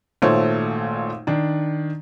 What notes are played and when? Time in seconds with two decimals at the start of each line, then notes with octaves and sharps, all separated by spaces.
0.22 G#1 A#2 A3 C5 C#5
1.27 D#3 D4